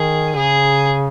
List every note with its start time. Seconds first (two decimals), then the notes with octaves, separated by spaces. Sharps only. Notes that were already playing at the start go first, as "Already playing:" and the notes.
Already playing: D#3 G#4
0.36 C#3 G#4